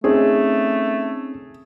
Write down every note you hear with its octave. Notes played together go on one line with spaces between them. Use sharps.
A3 C4 C#4 D#4 G#4